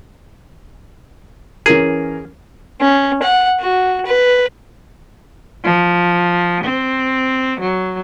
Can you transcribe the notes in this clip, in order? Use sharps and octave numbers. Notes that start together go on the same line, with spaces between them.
E3 C#4 G#4 A#4
C#4
F#5
F#4
B4
F3
C4
F#3